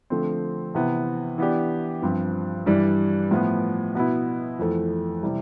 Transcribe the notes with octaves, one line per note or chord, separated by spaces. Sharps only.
D3 F3 A3 C4
C3 E3 B3
E3 B3 D4 G4
G2 F3 C4
G2 E3 G3 D4
A2 F3 B3
B2 B3 E4
F2 E3 A3
C3 E3 G3